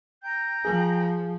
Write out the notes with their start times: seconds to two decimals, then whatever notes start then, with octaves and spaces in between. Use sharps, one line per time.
0.22 G5 A#5 G6
0.65 F3 G#4